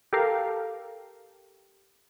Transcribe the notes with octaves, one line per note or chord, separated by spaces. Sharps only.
G4 A4 A#4 F5